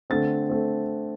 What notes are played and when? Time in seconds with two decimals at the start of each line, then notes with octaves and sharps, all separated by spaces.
0.10 D3 A3 C4 A6
0.49 A3 C4